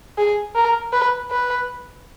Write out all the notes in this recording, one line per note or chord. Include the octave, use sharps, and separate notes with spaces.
G#4
A#4
B4
B4